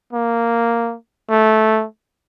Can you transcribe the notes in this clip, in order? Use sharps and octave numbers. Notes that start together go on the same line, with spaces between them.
A#3
A3